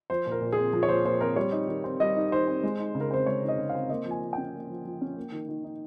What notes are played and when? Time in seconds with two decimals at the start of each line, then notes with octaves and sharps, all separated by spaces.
0.10 F3 C5
0.26 A#2
0.31 A#4
0.41 A#2
0.52 G#4
0.58 C4
0.73 F3
0.83 C#5
0.89 A#2 C5
1.05 A#2 C5
1.21 C4 A#4
1.36 G3 C#5
1.52 D#4
1.68 D#3
1.84 C4
2.00 G3 D#5
2.16 D#4
2.32 D#3 C5
2.47 C4
2.63 G#3
2.79 D#4
2.95 C#3
3.00 A#4
3.11 C4 C5
3.26 G#3 C#5
3.43 D#4
3.48 D#5
3.58 C#3
3.69 C4 F5
3.89 A#3 D#5
4.05 F3
4.11 G#5
4.22 F3
4.33 C#4 G5
4.54 A#3
4.70 F3
4.85 F3
5.01 C#4
5.17 A#3
5.32 D#3
5.48 D#3
5.64 D#4